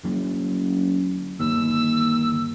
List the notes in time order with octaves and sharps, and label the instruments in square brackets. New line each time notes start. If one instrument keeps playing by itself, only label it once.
[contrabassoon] F#1 [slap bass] D2 F#3 C#4
[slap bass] G1 [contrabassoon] D#2 [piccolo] E6